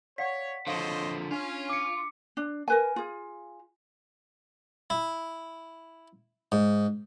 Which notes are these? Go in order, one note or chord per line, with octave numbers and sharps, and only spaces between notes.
C#5 D5 F5 F#5 B6
D3 F3 F4 C5 C#5 D#5 F5 C#6
C#4 D4 F4
D6 C#7
D4
A#4 B4 G#5
F4 G#4
E4
G#2